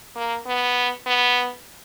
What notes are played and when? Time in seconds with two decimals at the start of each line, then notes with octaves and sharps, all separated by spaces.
0.16 A#3
0.47 B3
1.06 B3